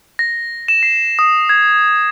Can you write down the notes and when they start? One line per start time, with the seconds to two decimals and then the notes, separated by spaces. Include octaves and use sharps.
0.19 A#6
0.68 E7
0.83 C7
1.19 D#6
1.49 G#6